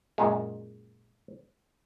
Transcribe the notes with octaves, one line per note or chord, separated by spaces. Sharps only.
F#2 A#2 G#3